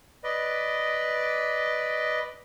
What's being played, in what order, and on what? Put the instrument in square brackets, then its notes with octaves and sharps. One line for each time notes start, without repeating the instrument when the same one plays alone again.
[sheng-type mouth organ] B4 D5 D#5